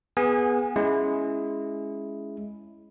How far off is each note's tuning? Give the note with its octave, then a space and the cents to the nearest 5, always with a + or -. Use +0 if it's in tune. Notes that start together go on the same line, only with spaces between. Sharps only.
B3 -5 G#4 +0 G#5 -25
G#3 +5 C#4 +0 E4 +0